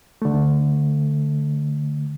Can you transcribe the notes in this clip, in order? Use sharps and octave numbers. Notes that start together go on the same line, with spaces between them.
D3 A3